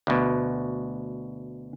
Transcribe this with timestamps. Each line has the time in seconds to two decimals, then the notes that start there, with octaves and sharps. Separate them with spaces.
0.07 D2 B2